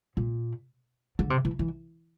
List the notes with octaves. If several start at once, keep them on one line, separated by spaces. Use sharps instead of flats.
A#2
D3
C3
E3
E3